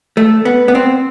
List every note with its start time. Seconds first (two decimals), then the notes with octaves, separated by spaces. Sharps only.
0.17 A3
0.45 B3
0.68 B3
0.75 C4